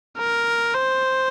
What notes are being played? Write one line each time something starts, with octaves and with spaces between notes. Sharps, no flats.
A#4
C5